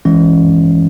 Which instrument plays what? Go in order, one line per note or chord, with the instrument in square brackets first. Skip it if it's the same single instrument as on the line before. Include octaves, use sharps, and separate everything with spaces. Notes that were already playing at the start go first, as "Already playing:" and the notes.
[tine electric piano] E3 G#3 C#4